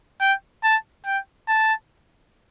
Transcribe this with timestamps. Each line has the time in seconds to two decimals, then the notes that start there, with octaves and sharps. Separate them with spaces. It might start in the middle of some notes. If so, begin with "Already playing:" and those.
0.21 G5
0.64 A5
1.06 G5
1.49 A5